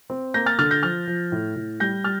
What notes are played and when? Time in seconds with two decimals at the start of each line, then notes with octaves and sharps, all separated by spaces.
0.10 C4
0.34 A#3 G6 A#6
0.46 F6 A6
0.59 D3 F6 A6
0.71 G6 A#6
0.83 F3 F6 A6
1.07 F3
1.32 A2
1.56 A2
1.80 G3 G6 A#6
2.04 G3 F6 A6